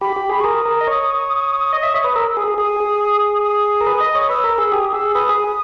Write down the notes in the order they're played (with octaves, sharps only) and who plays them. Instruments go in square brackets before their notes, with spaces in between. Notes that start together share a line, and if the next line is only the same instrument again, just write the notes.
[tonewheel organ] G4 [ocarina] B5
[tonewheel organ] G4
G#4
[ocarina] C#6
[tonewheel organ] A#4 [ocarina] D#6
[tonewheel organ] A#4
D#5
C#5
D#5
E5
C#5
B4
[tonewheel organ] A#4 [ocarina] E6
[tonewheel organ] G#4 [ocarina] D#6
[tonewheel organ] G#4
[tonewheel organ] G#4 [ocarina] D#6
[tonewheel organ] G#4
[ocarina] D#6
[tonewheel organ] A#4
B4
D#5
C#5
[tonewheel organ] B4 [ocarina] E6
[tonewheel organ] A#4
G#4
[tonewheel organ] G4 [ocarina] D#6
[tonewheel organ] G#4 [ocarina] E6
[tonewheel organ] B4 [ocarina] D#6
[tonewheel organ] G#4